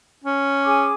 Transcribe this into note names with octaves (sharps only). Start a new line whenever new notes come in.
C#4
G#4 G#5 D6